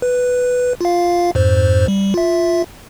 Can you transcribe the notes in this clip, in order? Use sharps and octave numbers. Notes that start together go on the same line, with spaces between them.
B4
F4 F5
F2 G#2 C5
G3
F4 E5